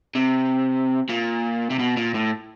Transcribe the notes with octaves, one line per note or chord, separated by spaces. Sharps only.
C3
A#2
C3
B2
A#2
A2